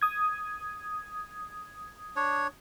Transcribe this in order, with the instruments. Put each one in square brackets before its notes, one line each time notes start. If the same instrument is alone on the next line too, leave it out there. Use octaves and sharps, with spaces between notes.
[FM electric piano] D#6 G#6
[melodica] D4 C#5